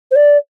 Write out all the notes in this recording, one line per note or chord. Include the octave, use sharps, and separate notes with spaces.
C5
D5